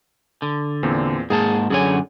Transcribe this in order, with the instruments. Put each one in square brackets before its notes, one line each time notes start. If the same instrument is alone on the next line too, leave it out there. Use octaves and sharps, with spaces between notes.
[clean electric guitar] D3
[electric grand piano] E2 A#2 C4
[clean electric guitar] G#2 A#3 A5 [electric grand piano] G#4
[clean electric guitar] F#2 D3 G#5 [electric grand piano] G#4 C#5